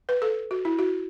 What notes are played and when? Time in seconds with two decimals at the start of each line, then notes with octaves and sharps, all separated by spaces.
0.09 B4
0.22 A4
0.51 F#4
0.65 E4
0.79 F#4